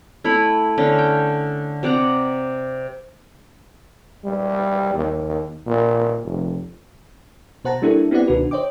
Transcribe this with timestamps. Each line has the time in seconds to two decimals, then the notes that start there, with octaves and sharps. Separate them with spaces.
0.24 A3 E4 C#5 B5
0.78 D3 C#4
0.99 G5
1.83 C3 D5 F#5 A#5
4.24 G3
4.94 D#2
5.67 A#2
6.23 F1
7.65 B2 C5 F#5 A5 A#5
7.82 G3 A#3 D4 E4 G4 A4
8.11 B3 C4 E4 G4 D5 F#5
8.27 C#2 B2 D#3 D4 F#4 B4
8.51 C5 C#5 D#5 G5 D6